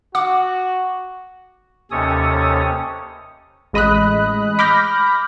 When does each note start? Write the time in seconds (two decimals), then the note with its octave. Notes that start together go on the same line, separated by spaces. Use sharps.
0.15 F#4 F#5 D6
1.91 D#2 C3 C#4 A4 C#5 D#6
3.73 A1 G#3 D#5 B5 D#6 F#6
4.59 B5 D6 F6 G6 A#6